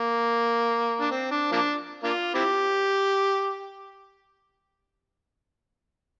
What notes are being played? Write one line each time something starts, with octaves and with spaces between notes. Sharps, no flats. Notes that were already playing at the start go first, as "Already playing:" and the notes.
Already playing: A#3
D4
C4
D4
F3 A#3 D4
A#3 D4 F4
C4 E4 G4